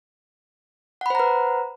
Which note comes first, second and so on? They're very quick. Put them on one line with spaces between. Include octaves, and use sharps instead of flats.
F#5 B5 C5 A#5 B4